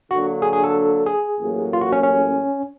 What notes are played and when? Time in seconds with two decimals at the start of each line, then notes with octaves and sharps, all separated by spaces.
0.10 D3 F#3 A#3 D4 F#4
0.42 G#4
0.53 G#4
0.64 A4
1.06 G#4
1.39 A1 A2 F#3 A#3
1.73 F4
1.81 F#4
1.92 C#4
2.03 C#4